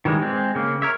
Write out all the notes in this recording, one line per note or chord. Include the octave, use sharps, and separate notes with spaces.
D#3 E3 G3 G#3
G#3 C4
C#3 A#3
A#4 C#5 E5